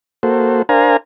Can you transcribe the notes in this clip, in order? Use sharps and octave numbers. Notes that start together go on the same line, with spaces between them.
A#3 F#4 A4 C5
D4 A#4 C5 F5 G#5 A#5